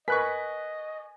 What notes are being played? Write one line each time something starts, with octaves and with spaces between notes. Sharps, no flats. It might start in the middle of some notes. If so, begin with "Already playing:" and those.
A#4 B4 D#5 G#5 C#6 F#6 B6